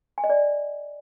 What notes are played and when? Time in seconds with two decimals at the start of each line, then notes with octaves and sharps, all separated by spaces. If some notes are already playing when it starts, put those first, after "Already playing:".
0.18 G#5
0.24 D#5
0.30 D5